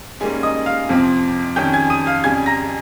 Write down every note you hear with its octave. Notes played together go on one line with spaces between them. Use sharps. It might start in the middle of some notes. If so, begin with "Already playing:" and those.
G#2 G3 A#3 C#4 G#4 G#5
D#5 D#6
F5 F6
F2 C3 F3 C4
F2 D#3 G3 C#4 G5 G6
G#5 G#6
D#6 D#7
F5 F6
F2 C#3 G3 G#5 G#6
A#5 A#6